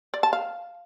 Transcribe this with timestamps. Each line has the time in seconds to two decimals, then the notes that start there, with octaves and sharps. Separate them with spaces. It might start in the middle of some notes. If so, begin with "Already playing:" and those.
0.14 D5
0.23 A5
0.33 F5